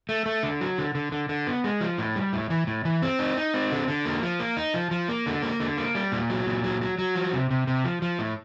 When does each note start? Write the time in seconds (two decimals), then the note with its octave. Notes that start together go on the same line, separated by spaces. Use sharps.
0.09 A3
0.26 A3
0.43 D3
0.61 F#3
0.78 D3
0.95 D3
1.12 D3
1.29 D3
1.47 B3
1.64 G#3
1.81 F3
1.98 A2
2.16 G3
2.33 A2
2.50 E3
2.67 A2
2.85 E3
3.02 C4
3.19 D#4
3.37 D#4
3.54 C4
3.71 D3
3.88 D3
4.05 A#3
4.23 F3
4.40 A#3
4.57 D#4
4.74 F3
4.91 F3
5.08 A#3
5.26 D3
5.43 A#3
5.60 D3
5.78 A#3
5.95 G3
6.12 A#2
6.30 F#3
6.46 A#2
6.64 F#3
6.81 F#3
6.99 F#3
7.15 F3
7.33 C3
7.51 C3
7.67 C3
7.85 F3
8.02 F3
8.19 A2